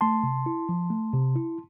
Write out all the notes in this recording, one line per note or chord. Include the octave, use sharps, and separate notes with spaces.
A3 A5 C6
C3
E4
F3
A3
C3
E4